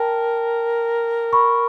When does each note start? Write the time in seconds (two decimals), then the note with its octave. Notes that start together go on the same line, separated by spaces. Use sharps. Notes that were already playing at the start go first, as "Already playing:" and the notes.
Already playing: A#4 G5 A5
1.33 B5 C#6